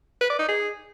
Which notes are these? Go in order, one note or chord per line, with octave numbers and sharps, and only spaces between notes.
B4
D5
D#4
G#4